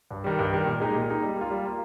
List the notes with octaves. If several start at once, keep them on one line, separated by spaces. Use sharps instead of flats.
G2
D#3 G3
G2
D#3 G3
A#2
G#3 D#4 G4
A#2
G#3 D#4 G4
G3
A#3 F4
G3
A#3 F4